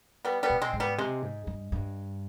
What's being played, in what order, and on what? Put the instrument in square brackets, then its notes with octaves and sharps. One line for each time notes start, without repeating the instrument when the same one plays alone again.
[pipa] G3 B3
G3 B3
[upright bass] B2
[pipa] G#3 C4
[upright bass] G#2
[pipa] G3 B3
[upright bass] C3 [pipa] G#3
[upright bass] G#2
G2
G2